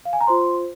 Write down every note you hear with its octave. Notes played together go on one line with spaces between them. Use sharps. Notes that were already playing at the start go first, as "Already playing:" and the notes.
F5
G#5
A#5
F4 C5 C6